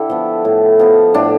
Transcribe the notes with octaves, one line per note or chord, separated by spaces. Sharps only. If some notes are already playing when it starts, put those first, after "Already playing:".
Already playing: D3 E4 G4 A4
F3 B3
A2
F3 B3
A2 D4